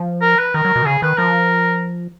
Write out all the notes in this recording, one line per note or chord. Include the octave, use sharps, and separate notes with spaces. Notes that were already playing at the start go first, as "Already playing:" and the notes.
Already playing: F3
A#4
B4
D#3 A#4
F#3
B2
D#3
C#3 G#4
D#3 B4
F3 A#4